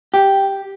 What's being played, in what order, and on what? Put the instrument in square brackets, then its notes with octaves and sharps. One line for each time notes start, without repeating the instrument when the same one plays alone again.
[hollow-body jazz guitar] G4